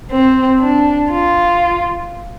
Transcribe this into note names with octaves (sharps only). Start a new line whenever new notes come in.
C4
D4
F4